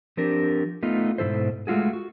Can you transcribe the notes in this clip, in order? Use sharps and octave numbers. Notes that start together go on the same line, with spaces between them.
F3 C4 D4 G4 A#4
A3 B3 D#4 F4
G#2 B2 E3 E4 A4 C5
G#3 A3 F4 F#4 G#4
F#4